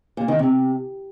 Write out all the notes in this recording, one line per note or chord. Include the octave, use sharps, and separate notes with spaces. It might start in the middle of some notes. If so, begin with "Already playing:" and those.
A#2
D#3
C3